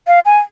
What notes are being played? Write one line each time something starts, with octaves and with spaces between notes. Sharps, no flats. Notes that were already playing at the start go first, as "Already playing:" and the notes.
F5
G#5